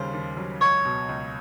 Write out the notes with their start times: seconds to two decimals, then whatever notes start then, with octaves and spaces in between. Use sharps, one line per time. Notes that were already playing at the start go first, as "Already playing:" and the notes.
Already playing: D#2 C#3 G3 C5
0.13 D#2
0.37 F#3
0.61 C#2 C#5
0.85 B2
1.09 C#2